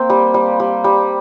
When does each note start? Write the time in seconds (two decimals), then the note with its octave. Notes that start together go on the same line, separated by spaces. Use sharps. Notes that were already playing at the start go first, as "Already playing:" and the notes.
Already playing: A#3 C4
0.10 G3
0.34 G3
0.60 G3
0.84 G3